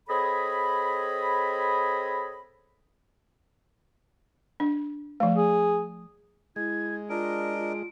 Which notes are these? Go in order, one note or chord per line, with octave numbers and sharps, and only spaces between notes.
C4 G#4 A4 C#5 D#5 B5
D4
F3 A3
G#4
G#3 E4 G#6
D4 F4 A#4 D#5 D7
F4